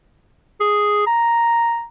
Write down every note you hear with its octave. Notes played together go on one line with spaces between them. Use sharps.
G#4
A#5